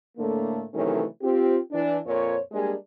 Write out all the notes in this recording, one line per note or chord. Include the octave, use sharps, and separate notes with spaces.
A2 D3 A3 A#3
C3 D#3 E3 F#3 A3 C#4
C4 F4 G4
E3 D4
F2 A#2 C5 C#5
G3 G#3 A#3 D4 G#4